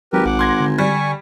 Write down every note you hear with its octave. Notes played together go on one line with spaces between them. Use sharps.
G#1 F#3 G4 A#4 B4
A#1 F#5 D6
C6 G#6 A#6
D3
G3 G#5 C#6